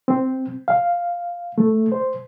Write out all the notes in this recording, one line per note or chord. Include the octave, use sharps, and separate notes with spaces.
C4
F5
A3
C5